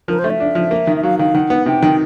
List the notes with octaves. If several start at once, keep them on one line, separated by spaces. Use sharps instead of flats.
F3 A#4
C5
A3
E5
D4
F3
A#3
D#3
E5
F#3 F5
D#3 F5
D#3 F#5
B3
C3 G5
D#3